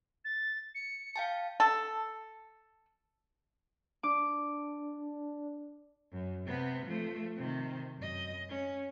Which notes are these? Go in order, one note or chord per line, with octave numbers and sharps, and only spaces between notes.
A6
C#7
F5 G5 A5
A4
D4 D6
F#2
C3 B3
F3 A3
C3 D#3
F#2 D#5
C#4